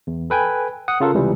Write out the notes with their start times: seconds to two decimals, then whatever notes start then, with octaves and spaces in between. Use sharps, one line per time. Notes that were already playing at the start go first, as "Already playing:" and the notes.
0.07 E2
0.30 A4 B4 G5 G#5
0.88 F#5 D#6
1.00 C#3 F4 A4 A#4
1.14 C#2 C3 E3 G3